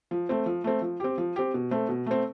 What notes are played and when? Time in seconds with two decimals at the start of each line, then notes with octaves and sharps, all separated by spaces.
0.11 F3
0.29 A3 C4
0.46 F3
0.64 A3 C4
0.82 F3
1.00 C4 G4
1.18 F3
1.36 C4 G4
1.54 B2
1.71 A3 C4
1.89 B2
2.06 A3 C4